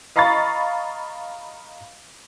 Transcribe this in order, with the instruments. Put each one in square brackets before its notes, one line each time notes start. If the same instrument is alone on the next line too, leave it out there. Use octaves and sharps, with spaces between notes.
[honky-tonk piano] D#5 F5 A#5 B5 C#6 A6